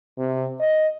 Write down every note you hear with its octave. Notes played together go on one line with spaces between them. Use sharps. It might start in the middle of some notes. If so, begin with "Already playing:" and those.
C3
D#5